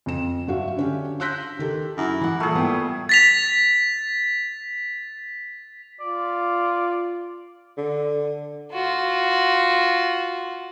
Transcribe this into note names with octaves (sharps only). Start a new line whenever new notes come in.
F2 E7
G2 F#3 F#4 E5 F5
D3 C#4 G4
C6 E6 F#6 G6 A#6 B6
D#3 G4 A4
F#2 E4
E3 F#5
A#2 G3 A3 G#4
B3 G5
A6 B6 F7
F4 D5
D3
F4 F#4